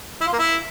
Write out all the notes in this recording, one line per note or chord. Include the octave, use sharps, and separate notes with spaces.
E4
F4
A#3
E4